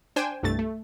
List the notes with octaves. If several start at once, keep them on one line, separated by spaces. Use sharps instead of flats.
D4 C5 G5 G#5 E7
C2 G2 A3 A6
A3